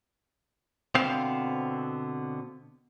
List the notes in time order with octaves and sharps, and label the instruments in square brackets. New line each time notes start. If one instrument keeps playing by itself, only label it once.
[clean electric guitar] B2 D3 B3 C4 C5 F5